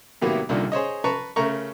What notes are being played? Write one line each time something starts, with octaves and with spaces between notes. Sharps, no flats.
A2 C3 D#3 F#3 A#3 B3
C2 A#2 D3 D#4
G#4 C5 C#5 D#5
B4 A5 A#5 C#6
C#3 A3 A#4 A#5 C#6